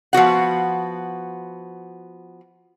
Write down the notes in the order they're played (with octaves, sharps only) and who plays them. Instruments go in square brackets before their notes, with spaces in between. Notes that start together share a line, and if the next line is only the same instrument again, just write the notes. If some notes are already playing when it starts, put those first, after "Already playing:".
[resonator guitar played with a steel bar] F3 B3 F#4 F#5